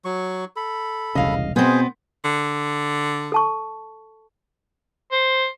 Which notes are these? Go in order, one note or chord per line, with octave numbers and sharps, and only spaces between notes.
F#3 C#6
A4 B5
E1 C2 C#3 D#5 F5
B2 B3 C4 G#4 C5 G#5
D3
A4 A5 C#6
C5